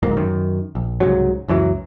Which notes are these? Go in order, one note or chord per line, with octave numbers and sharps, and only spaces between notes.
D1 G#2 A#3
F#2 D#3
A#1
C2 G#2 C#3 F#3
C#2 F#2 E3 F#3